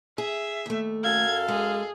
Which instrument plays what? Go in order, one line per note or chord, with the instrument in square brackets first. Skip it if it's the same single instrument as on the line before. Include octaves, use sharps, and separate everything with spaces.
[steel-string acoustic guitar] G#4 [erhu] E5
[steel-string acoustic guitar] D#2 A3
[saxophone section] F#2 A4 F5 [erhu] G#6
[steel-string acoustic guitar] G#3 [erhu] G#4